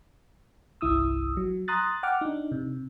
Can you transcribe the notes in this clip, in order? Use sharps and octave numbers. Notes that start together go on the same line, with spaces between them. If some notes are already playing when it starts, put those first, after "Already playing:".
G1 C2 E4 D#6 E6
F#3
A#5 C6 D#6 F#6 A6
F#5 G5 D6 F6
D4 D#4
C3